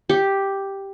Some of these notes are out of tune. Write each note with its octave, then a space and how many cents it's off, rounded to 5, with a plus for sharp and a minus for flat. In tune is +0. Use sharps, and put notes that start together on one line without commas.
G4 +0